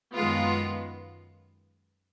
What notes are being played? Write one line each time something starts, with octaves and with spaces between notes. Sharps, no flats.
F#2 D#3 G#3 B3 F4